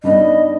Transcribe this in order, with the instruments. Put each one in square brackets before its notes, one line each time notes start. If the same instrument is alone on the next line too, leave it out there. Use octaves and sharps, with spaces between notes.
[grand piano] G2 G3 B3 D#4 [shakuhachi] D#5